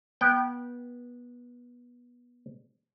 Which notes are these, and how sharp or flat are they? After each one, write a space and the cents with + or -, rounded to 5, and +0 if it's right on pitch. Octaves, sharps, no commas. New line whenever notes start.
B3 -20 G5 -15